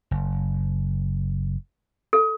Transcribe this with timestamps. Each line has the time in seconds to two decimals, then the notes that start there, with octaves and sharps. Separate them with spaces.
0.11 F#1
2.13 A4